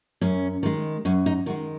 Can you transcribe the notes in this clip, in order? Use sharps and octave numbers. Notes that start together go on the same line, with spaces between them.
F#2 C#4
D#3 G#3
F#2 C#4
D#4
D#3 G#3 F#4